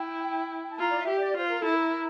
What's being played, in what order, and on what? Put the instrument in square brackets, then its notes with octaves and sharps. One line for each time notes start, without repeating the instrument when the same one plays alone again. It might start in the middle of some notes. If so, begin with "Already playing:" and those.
Already playing: [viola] E4 [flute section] G5
[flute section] G5
A5
[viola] F4 [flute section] A#5
[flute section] D5
E5
[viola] G4
[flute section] D5
[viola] F4 [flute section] C5
[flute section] A#4
A4
[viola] E4
[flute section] A#4